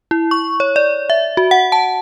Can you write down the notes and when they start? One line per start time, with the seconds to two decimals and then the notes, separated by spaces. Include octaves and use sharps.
0.11 E4
0.31 C#6
0.60 C#5
0.76 D5
1.10 E5
1.37 F#4
1.51 F#5
1.72 A5